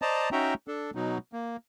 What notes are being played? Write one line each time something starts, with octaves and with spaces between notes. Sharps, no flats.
C5 D5 D#5 A5 A#5
C#4 D#4 F#4 E5 G5 A#5
D4 A4
B2 F#3 D#4
A#3